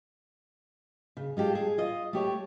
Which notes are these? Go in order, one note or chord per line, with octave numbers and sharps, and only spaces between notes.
C#3
G#3 F4 G4 A4
G#4
F4 D#5
A3 G4 C#5